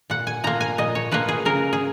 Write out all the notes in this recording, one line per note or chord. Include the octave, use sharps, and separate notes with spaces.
A#2 F#5
G#5
F3 A#3 A#5
G#5
A#2 D#5
C#5
F3 A#3 B4
G#4
C#3 A#4
G#4